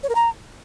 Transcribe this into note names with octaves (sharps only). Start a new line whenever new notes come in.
C#5
A#4
A#5